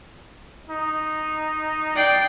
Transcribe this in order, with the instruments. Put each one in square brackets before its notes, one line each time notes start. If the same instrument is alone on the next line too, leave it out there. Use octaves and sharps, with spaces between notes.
[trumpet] D#4
[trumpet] D5 [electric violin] G5 C7